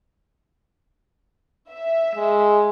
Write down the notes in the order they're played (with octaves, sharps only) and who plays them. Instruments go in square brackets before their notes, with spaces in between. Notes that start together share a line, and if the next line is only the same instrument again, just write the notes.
[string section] E5
[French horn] G#3